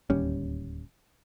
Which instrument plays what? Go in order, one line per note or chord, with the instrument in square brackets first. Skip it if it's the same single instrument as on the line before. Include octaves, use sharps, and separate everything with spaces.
[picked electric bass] D1 D#2 G3 C#4